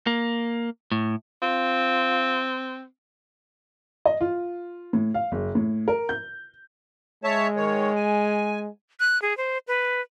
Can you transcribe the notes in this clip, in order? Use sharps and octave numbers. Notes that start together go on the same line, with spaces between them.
A#3
A2
C4 F4
D#5
F4
A2
F5
F#1
A2
A#4
G6
G#3 C#5 E5 A5
D#3 C#5
G#5
F#6
G#4
C5
B4